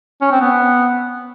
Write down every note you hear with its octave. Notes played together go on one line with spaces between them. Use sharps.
C#4
C4
B3